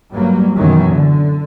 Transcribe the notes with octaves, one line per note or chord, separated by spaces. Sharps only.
G2 F#3 G3 A#3
F#2 B2 D#3 E3 F#3 C#4
D3